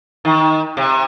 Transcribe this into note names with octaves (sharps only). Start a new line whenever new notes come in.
D#3
C3